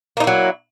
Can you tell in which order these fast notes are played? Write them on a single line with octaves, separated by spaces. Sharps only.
A#3 D#4 E4 F#3